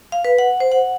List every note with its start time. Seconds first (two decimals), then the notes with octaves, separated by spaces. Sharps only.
0.12 F5
0.25 B4
0.38 F#5
0.60 C5
0.72 F#5